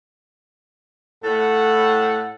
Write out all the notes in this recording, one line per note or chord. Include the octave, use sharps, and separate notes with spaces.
A2 A4 F#5